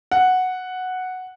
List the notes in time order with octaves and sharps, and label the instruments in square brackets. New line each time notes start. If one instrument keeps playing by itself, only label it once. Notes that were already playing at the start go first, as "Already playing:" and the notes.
[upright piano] F#5